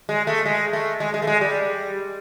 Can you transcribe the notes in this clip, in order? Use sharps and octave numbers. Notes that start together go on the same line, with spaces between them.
G#3
A3
G#3
A3
G#3
G#3
A3
G#3
G3